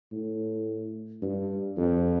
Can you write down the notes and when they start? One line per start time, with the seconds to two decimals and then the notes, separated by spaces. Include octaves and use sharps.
0.12 A2
1.22 G2
1.77 F2